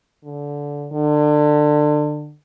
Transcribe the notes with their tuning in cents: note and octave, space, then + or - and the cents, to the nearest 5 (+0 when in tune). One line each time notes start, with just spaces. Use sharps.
D3 -20
D3 +25